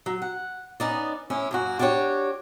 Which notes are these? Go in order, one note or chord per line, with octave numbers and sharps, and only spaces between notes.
F#3
F#5
B3 C#4 D#4 D5
A2 C#4 E4
F#2 A#3 F#4
D4 E4 F#4 G4 C#5